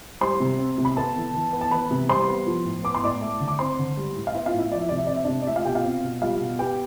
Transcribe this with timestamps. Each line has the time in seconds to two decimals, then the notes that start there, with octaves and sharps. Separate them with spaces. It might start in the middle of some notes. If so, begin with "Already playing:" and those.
0.21 G3 C5 C6
0.40 C3
0.59 C4
0.78 C3
0.85 B5
0.97 B3 A4 A5
1.16 E3
1.34 E3
1.53 B3
1.61 A5
1.71 E3 B4 B5
1.91 C3
2.09 G3 C5 C6
2.28 B3
2.46 F3
2.65 A2
2.84 B3 D6
2.95 C6
3.02 A2 D5 D6
3.21 A3
3.40 D3
3.48 D6
3.59 C4 C5 C6
3.79 D3
3.97 G3
4.15 A2
4.27 F5
4.34 B3 E4 E5
4.46 F4 F5
4.53 A2
4.59 E4 E5
4.72 F3 D5
4.81 E5
4.89 C3 D5
4.97 E5
5.07 C4 D5
5.16 E5
5.24 C3 D4 D5
5.42 D5
5.46 A3 E4 E5
5.56 F4 F5
5.65 B2 G4 G5
5.75 F4 F5
5.84 C4
6.03 B2
6.22 G3 F4 F5
6.40 B2
6.59 B3 G4 G5